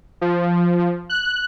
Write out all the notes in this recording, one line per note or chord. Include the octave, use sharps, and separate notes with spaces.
F3
F#6